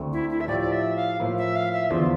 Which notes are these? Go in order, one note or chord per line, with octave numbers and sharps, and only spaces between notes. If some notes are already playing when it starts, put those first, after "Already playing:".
Already playing: D2 D3 A3 C4
E4
E4
E5
A2 F3 A3 E4 G4 D5
D5
E5
F5
A2 F3 A#3 E4
E5
F5
E5
E2 D3 F3 F4